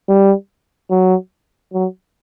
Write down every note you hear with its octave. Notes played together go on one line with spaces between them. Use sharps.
G3
F#3
F#3